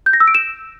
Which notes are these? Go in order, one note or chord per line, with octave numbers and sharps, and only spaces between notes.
G6
A#6
E6
D7
E7